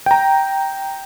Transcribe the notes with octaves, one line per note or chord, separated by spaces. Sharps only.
G5 A#5